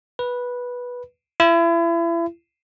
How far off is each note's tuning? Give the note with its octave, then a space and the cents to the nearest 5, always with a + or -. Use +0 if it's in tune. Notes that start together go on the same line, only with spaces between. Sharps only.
B4 -10
E4 +35